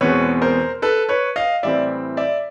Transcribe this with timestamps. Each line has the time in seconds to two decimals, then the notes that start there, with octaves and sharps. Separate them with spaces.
0.01 E2 B2 G#3 C4 B4 C#5
0.42 A#4 C5
0.82 A4 B4
1.09 B4 C#5
1.36 D#5 F5
1.63 A2 E3 G3 C4 D5 E5
2.17 D5 E5